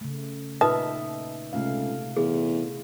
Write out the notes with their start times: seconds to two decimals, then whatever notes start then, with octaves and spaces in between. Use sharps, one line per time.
0.01 C#3 A3
0.61 A#2 D#4 F4 B4 E5 A5 D#6
1.53 C#2 C3 A3 F5
2.16 E2 G#4